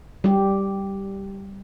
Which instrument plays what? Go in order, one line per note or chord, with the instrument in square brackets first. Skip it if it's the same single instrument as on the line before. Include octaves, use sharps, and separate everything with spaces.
[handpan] G3 G4